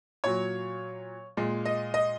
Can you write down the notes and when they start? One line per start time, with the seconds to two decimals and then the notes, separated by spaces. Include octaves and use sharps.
0.24 A#2 F#3 C#5
1.37 A#2 G#3
1.65 D#5
1.94 D#5